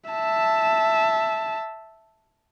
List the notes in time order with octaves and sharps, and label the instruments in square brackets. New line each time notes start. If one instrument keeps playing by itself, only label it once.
[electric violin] E5 A5